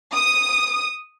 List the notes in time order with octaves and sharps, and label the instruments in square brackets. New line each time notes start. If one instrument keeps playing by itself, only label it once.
[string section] D#6